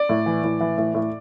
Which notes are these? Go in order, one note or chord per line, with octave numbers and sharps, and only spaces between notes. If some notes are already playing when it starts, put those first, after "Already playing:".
Already playing: D5
A2
E3
A2
E3
A2
A2